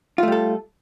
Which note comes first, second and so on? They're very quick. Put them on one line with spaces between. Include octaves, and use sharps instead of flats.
F4 A3 G3 A4